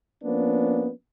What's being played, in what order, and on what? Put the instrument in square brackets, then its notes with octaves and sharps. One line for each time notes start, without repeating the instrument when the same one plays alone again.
[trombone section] F3 A#3 B3 C#4 D4